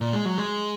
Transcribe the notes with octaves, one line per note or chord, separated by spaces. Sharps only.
A#2
G#3
F#3
G#3